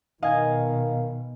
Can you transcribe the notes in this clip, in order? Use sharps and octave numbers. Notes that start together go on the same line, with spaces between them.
B2 D#3 D#5 F5 G#5